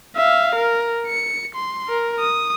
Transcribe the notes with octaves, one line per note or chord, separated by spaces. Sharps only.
E5 F5
A#4
C#7
C6
A#4
D#6